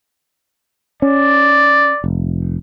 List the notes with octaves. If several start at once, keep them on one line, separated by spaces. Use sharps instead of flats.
C#4 D5
F1